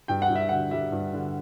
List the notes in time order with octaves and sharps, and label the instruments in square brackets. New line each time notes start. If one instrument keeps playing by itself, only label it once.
[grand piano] G2 G5
F#5
G2
E5
D3 F#5
G3 E5
G2
D3